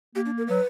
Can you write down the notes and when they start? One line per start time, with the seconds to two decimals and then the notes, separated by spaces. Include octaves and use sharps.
0.15 A#3 G4
0.26 D4
0.38 A#4
0.48 F#3 B4